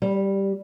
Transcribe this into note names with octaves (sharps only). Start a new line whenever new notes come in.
G3